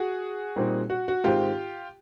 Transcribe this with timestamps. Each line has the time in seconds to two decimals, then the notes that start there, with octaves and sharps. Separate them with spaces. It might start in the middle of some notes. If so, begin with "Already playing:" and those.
Already playing: F#4 G#4
0.56 A#2 G3 C4 D#4
0.90 F#4
1.08 F#4
1.24 G#2 D#3 G#3 C4 F4 G4